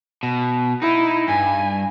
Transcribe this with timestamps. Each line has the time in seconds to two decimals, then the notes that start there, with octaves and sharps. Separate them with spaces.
0.23 B2
0.82 D#4 E4
1.28 G2 G#5